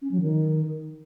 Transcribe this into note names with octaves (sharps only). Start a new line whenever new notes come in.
C#4
F#3
D#3